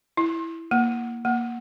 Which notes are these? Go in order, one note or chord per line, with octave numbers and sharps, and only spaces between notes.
E4
A#3
A#3